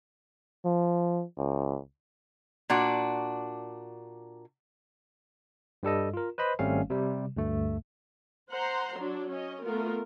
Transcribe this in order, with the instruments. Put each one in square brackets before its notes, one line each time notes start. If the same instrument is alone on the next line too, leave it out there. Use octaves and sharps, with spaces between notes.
[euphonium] F3
C#2
[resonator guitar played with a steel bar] A#2 D4 F#4
[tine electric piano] G2 G3 A4 D#5
F4 A#4
B4 C5 D#5 B5
G#1 G3 A3 C4 C#4 F5
C3 G3
D2 G2 A3
[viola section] C5 F#5 A#5 C6
F#3 D4
C#4 D#5
A3 B3 F4 A#4